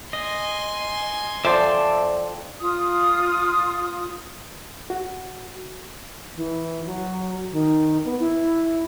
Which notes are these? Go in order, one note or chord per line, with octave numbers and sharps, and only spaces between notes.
D#5 G#5 C6
F2 C5 D5 E5 A5
F4 D#6
F#4
E3
F#3
D#3
B3
E4